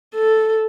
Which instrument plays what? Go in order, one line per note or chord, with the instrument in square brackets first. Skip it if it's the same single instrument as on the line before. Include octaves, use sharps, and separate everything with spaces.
[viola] A4